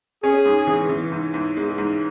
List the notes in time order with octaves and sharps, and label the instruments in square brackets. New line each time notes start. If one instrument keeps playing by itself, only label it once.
[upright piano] C#4 [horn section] G#4
[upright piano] G#2
E3
E3
G#2
G#2
G#3
G#2